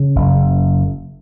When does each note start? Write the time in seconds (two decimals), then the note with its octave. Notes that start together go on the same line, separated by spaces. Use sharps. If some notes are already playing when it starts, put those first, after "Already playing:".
Already playing: C#3
0.16 F#1